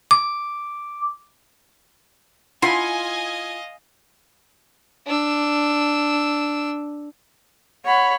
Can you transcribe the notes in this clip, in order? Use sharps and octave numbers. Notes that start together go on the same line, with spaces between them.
D6
E4 F4 D#5 F5 F#5 G#5 C6
D4 E6
C#5 F#5 B5